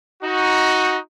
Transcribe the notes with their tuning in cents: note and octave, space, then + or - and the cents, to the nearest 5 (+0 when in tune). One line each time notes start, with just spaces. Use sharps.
D#4 +15 F#4 +0